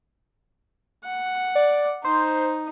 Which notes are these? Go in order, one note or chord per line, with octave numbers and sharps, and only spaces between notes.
F#5
D5
D#4 C5